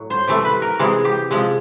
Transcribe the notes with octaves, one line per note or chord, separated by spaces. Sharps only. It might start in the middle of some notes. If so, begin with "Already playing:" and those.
Already playing: A2 F#3
C5
C3 E3 A3
B4
A#4
C3 E3 G#3 G#4
G4
C3 F3 G#3